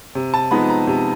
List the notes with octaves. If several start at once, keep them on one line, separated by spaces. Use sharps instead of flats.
C3
A5
F3 G#3 B3 D#4 B5
A#5
C3